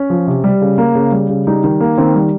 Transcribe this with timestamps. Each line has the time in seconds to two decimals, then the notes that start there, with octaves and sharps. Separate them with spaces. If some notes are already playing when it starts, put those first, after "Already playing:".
Already playing: C#4
0.10 F3
0.27 C3
0.44 G3
0.62 C#3
0.78 A#3
0.95 C#3
1.12 G3
1.30 C#3
1.47 G3 D#4
1.64 D#3
1.81 A#3
1.98 D#3 C4
2.15 G3